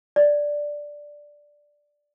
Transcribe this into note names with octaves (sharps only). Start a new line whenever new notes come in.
D5